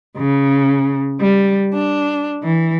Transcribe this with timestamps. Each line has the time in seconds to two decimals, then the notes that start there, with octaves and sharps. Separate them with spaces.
0.17 C#3
1.21 G3
1.73 D4
2.44 E3